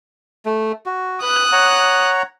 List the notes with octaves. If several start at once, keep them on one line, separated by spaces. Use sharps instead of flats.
A3
F#4
B4 D#6 F#6
C#5 F#5 A#5